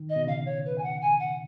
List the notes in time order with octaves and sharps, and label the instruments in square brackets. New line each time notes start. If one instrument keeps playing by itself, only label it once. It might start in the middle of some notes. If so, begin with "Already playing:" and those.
Already playing: [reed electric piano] D#3
[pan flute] D#5
[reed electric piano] B2
[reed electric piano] C#3 [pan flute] F5
[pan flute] C#5
B4
G#5
F#5
G#5
F#5